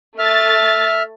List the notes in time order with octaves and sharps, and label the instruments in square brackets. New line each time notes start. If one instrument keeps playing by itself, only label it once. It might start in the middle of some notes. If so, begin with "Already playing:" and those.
[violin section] A3 A6 [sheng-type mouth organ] E5 F6